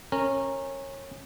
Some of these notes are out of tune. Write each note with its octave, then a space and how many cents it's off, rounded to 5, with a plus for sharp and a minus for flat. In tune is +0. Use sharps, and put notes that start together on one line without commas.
C#4 -20 A#4 -15